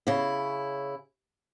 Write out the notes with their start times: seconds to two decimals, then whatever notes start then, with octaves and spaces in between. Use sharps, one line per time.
0.07 C#3 E4